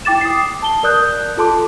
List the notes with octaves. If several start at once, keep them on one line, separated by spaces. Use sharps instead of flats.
E4 G5 D6 A6 E7
D#6 C7
A5 G7
A#4 D5 D#6 F#6 G6
F4 A4 A5 C6 D6